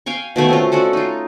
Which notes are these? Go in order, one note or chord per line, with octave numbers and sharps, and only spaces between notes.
F5 G5 G#5 C#6
B2 D#3 A3 B5
C4 C#4 F4
C#4 F#4 A4 D5
D#4 F4